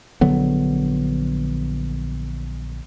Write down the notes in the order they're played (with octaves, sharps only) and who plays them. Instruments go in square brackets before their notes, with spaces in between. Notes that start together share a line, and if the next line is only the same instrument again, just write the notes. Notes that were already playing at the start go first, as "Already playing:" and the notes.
[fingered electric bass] A#1 D3 F#3 B3